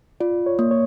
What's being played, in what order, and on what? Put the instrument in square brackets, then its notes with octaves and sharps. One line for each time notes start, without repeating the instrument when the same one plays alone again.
[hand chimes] F4 [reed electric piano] D5
[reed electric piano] C#5
[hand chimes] A#3
[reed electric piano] C#5